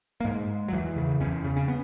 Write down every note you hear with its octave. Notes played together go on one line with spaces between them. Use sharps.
A#3
G#2 G#3
F#3
E2 E3
C#3
E2 C#4
C#3
C#4
B3